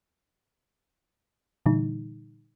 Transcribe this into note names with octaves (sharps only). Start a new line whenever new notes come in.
A#2 D3 E3 G3 D#4